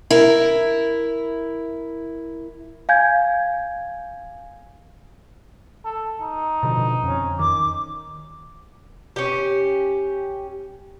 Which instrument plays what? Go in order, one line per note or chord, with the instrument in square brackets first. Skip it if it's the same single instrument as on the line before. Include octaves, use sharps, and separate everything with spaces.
[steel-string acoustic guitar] E4 A#4
[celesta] F5 G#5 G6 G#6
[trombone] A4
D#4
[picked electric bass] B2 D3 F3
[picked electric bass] F2 [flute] C#4
[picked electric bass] D#3 [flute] D6
[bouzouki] C#4 G4